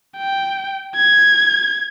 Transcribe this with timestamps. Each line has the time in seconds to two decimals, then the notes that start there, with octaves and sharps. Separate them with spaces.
0.17 G5
0.96 G#6